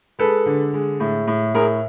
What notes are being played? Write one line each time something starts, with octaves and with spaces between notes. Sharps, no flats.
G#3 A4 B4
D3
G#3
A2
A2
A2 G#4 A#4